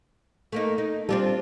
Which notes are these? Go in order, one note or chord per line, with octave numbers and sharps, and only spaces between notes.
A3 A#3 D#4
D#4
G3 C4 D4 F4 A4